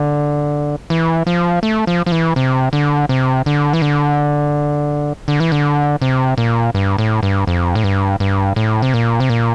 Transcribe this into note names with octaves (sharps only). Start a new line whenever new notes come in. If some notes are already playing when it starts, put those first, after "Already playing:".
Already playing: D3
E3
F3
A3
F3
F3
E3
C3
D3
C3
D3
E3
D3
D3
E3
D3
C3
A#2
G2
A2
G2
F2
A2
G2
G2
A2
C3
A#2
C3
A#2